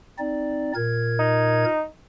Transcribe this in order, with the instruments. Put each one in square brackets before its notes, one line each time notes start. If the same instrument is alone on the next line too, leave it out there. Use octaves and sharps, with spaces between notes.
[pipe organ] C4 D#4 D5
A#2 A#4 G#6
[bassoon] D#4